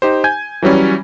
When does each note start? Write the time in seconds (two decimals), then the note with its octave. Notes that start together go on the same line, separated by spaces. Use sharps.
0.02 D#4 G4 C5
0.24 G#5 G6 G#6
0.62 E3 F#3 G3 C#4